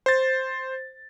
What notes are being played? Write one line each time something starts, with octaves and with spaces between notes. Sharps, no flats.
C5 A6